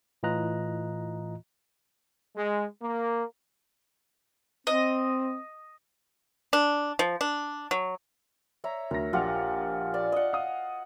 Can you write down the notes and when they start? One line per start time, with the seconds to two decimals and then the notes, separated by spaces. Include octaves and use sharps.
0.23 A2 E3 F4 D#5 A#5 F#6
2.36 G#3
2.82 A#3
4.67 C4 D#5
6.53 D4
6.99 F3
7.21 D4
7.71 F#3
8.64 C#5 E5 A#5
8.91 D2 A#4 A#6
9.13 A#1 F4 G4 F#5 F6
9.94 D5 G#5 A5
10.12 D#5 F#5
10.33 F5 D#6